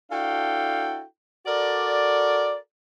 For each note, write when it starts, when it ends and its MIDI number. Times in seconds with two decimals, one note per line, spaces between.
0.11 1.03 62
0.11 1.03 64
0.11 1.03 66
0.11 1.03 69
0.11 1.03 77
0.11 1.03 79
1.47 2.57 66
1.47 2.57 69
1.47 2.57 70
1.47 2.57 74